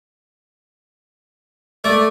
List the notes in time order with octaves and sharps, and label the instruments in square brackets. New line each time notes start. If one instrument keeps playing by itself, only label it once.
[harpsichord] A3 [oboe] D5